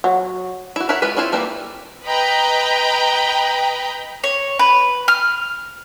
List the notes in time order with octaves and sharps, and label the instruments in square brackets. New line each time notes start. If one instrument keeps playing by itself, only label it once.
[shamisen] F#3
[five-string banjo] E4 F#4
A#4 B4 C#5 E5 F#5
E3 G#3 F4 B4
C4 E4 F4 C5 C#5
E3 G3 A#3 C4
[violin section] B4 D#5 G5 A#5 B5
[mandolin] C#5
B4
F6